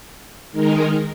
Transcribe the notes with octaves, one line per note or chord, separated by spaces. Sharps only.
D#3 G#3 D#4 A#4